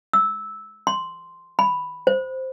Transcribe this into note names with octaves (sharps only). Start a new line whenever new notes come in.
E6
C6
B5
C5